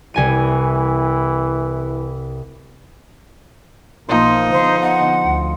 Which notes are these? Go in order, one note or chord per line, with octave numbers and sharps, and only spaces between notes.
C2 E3 G#5 D#7
B1 F3 A#3 D#4 C6
D3 B3 C5
F#5
D2